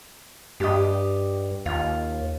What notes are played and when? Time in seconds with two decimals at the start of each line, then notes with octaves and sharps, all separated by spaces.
0.60 G2 G4 D#5
1.66 D#2 F4